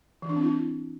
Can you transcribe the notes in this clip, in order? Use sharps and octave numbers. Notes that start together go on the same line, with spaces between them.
E3
D4
C4
E4